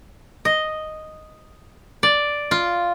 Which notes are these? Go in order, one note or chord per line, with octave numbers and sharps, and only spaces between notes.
D#5
D5
F4